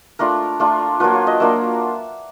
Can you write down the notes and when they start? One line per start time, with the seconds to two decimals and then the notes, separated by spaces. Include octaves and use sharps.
0.19 A3 D4 F4 A#4
0.60 A3 D4 F4
1.00 F#3 A#3 D4 F4 B4
1.14 C#5
1.27 D#5
1.40 F#3 A#3 D4 F4 E5